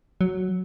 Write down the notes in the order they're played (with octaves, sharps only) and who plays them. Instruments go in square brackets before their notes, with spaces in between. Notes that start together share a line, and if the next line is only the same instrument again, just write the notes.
[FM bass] F#3